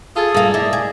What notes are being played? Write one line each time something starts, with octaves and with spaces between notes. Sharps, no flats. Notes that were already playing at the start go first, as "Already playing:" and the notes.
F4 G#4 A4 D#6
G2 A#3 F5
E4 D5 D#5
G#4